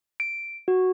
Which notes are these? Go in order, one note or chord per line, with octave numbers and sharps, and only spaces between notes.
D7
F#4